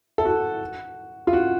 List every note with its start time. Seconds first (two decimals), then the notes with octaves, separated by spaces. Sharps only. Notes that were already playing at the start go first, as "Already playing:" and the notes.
0.18 A4
0.25 F#4
1.27 F4
1.33 F#4